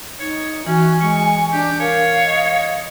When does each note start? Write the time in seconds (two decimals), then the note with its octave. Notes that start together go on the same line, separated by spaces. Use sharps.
0.20 D#4 C#5
0.67 E3 C#4 F#4 G#5
1.01 G#3 C#6
1.53 D4 G4
1.80 A#4 C#5 F5
2.24 D#5